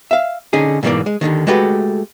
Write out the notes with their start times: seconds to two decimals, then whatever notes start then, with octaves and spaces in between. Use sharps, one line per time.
0.11 E5 F5
0.53 D3 C#4 D#4 G#4
0.83 G#2 B2 E3 F#3 A#3 D5
1.06 G#3
1.21 D#2 A2 D3 D#3
1.47 G#3 A3 F#4 G4 A4 B4